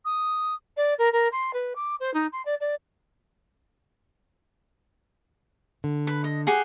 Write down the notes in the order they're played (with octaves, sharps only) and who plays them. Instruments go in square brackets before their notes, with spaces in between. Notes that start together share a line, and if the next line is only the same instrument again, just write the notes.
[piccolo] D#6
[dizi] D5
A#4
A#4
C6
B4
D6
C5
D#4
C6
D5
D5
[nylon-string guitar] D3
[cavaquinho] B4
D#5
G4 G#4 F#5